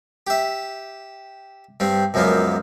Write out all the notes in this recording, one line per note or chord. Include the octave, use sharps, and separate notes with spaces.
G4 E5
G2 G3 C4
C#2 F#2 F3 F#3 A#3 B3